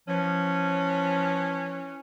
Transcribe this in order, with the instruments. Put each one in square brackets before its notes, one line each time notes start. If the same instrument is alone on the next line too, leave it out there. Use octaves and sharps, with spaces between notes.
[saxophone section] E3 C#4 [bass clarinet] F3